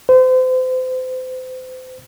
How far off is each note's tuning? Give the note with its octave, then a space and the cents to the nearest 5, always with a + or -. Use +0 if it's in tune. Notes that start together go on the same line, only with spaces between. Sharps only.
C5 -35